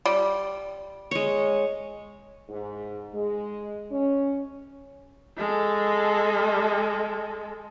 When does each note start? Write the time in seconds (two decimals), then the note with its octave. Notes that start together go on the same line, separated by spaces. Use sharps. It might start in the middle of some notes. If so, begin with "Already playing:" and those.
0.05 G3
1.11 G#3 C#5
2.48 G#2
3.14 G#3
3.91 C#4
5.37 G#3 A4